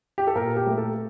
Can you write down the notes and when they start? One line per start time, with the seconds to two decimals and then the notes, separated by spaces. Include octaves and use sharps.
0.18 G4
0.27 A4
0.35 A#2 A#4
0.57 G4
0.67 A3
0.78 A4